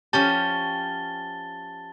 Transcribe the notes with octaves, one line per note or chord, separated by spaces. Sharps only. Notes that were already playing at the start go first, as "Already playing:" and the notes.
F3 C#4 G4 A5 A6 G7